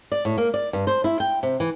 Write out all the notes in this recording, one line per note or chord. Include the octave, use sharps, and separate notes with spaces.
D5
A2
A#3
D5
G2
C5
E4
G5
C3
E3